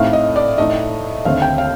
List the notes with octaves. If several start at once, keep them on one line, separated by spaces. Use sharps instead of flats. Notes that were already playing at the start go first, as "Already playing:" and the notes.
Already playing: A2 A3 C4 D#4 F5
D#5
D5
A2 A3 D#4 D#5
D#2 D3 A3 C4 F5
G5
F5